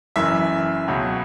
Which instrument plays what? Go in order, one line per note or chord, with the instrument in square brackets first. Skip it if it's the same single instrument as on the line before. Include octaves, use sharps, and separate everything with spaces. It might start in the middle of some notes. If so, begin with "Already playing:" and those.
[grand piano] F#1 F#2 E3 E5
C#2 B2 F#3